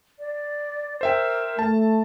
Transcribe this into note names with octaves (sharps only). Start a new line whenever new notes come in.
D5
A#4 C5 E5 G5
A3 A5